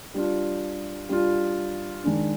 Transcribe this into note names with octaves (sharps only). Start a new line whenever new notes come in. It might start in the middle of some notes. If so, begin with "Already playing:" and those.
G3 D4 F4
G3 D4 F4
D#3 G#3 D4